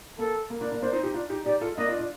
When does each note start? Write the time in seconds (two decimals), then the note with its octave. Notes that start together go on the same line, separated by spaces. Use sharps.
0.19 A#3 A4
0.50 A#3
0.61 A#3 D4
0.71 A#3 D4
0.82 A#3 D4 C5
0.93 C4 D#4
1.03 D#4 G4
1.14 D4 F4
1.30 D#4 G4
1.45 D#4 G4 D5
1.61 F4 A4
1.77 A#3 D4 D#5
1.88 D4 F4
1.99 D4 F4